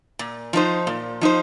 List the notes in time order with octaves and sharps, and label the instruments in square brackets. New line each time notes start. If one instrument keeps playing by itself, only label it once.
[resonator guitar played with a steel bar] A#2
F3 D#4 C5
A#2
F3 D#4 C5